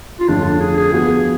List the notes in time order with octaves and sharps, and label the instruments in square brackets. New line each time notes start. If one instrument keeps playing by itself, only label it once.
[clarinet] F4
[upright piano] F2 D3 F3 A3 C#4 [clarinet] D4
[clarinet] D4
G#4
G#4
[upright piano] F3 B3 F#4 [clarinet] G#4